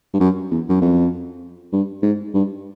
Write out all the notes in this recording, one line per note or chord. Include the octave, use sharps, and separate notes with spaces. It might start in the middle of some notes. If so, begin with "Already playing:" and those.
G2
F#2
E2
F#2
F2
G2
G#2
G2